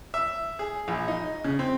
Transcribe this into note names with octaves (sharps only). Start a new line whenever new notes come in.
E5
G#4
A#1
D#4
C#3
C4